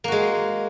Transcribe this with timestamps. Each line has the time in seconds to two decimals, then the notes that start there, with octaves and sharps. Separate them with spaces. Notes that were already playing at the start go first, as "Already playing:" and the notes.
0.04 A#3
0.08 F#4
0.12 G#3